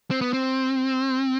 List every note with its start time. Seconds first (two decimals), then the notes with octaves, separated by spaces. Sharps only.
0.11 C4
0.21 B3
0.33 C4